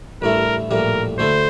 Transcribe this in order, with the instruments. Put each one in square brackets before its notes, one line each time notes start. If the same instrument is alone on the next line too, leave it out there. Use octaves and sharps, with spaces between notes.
[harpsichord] A1 G2 E3 A3 E4 [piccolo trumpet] A#4
[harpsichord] A#1 A2 E3 G3 A#3 [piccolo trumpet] A#4
[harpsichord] D2 D3 A3 E4 A4 [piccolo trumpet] C5